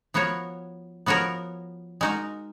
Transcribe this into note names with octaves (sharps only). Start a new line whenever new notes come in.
F3 B3 F#4 A#4 C#5
F3 B3 F#4 A#4 C#5
G#3 D#4 F#4 A#4